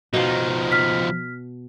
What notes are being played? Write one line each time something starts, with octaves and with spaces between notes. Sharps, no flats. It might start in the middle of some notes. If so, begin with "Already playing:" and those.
B2 F3 D#4 F5
F6 B6